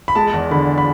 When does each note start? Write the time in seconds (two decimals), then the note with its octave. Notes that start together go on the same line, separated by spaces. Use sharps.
0.08 B5
0.15 G#3 A5
0.33 E2
0.51 D3 B5
0.78 B5